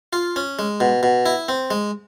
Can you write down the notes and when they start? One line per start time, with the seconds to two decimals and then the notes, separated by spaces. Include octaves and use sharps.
0.13 F4
0.36 C#4
0.59 G#3
0.80 B2
1.03 B2
1.26 E4
1.49 C4
1.71 G#3